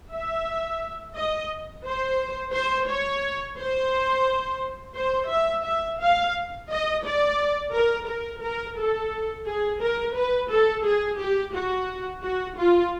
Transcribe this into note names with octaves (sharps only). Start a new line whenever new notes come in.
E5
D#5
C5
C5
C#5
C5
C5
E5
E5
F5
D#5
D5
A#4
A#4
A#4
A4
G#4
A#4
B4
A4
G#4
G4
F#4
F#4
F4